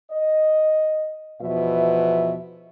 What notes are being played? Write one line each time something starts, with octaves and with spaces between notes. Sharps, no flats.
D#5
E2 B2 F3 B4 E5